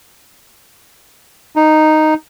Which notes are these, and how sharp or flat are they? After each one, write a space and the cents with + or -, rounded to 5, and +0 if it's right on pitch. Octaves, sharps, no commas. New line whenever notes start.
D#4 -5